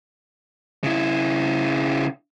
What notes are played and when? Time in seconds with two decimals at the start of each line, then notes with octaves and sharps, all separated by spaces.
0.84 C#3 E4